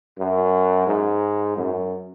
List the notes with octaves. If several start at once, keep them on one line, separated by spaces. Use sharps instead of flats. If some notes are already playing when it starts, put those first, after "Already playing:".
F#2
G#2
F#2